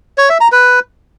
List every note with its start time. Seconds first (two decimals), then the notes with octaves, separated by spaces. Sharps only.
0.18 C#5
0.29 E5
0.41 A#5
0.52 B4